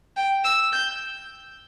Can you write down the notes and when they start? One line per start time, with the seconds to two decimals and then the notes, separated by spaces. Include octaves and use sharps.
0.17 G5
0.44 E6
0.73 G6